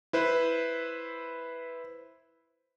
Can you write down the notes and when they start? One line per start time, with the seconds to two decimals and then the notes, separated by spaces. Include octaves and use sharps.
0.13 E4 B4 C5